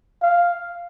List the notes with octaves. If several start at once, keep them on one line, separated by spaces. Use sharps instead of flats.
F5